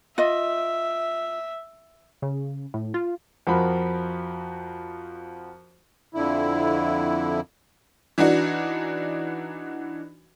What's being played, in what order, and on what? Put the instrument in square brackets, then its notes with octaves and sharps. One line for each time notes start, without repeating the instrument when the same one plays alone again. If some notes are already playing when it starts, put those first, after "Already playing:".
[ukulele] F4 D#5 [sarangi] E5
[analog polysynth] C#3
A2
F4
[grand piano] F2 F3 F#4 A#4 B5
[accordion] F2 D3 E4
[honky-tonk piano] E3 D4 D#4 F#4